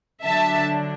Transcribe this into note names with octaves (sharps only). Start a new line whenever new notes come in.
D3 F#3 D4 E5 A5